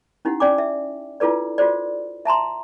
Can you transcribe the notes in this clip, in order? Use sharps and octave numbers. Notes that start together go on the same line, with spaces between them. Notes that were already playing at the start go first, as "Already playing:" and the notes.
C#4 D#4 E4 G4 F#5
C#4 D5 G5 G#5 D6
E5
D4 E4 F4 A4 B4 D5
F4 F#4 A4 C5 D5
E5 A5 A#5 C6